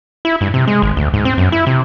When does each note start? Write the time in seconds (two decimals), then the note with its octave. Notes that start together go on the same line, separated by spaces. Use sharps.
0.25 E4
0.41 G2
0.54 C3
0.67 G#3
0.82 G#1
0.97 D2
1.13 G#2
1.25 C4
1.38 F#2
1.52 E4
1.67 C3